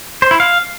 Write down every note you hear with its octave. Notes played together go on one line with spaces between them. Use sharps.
C5
E4
F5